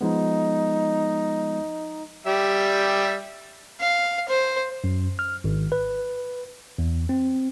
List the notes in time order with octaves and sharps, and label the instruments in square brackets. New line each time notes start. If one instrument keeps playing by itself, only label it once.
[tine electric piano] F3 G#3 B3 [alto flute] D#4
[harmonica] G3 G4 E5
[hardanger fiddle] F5
C5
[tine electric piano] F#2
F6
G#1
B4
E2
C4